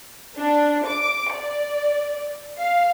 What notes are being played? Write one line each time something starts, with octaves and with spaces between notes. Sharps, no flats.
D4
D6
D5
F5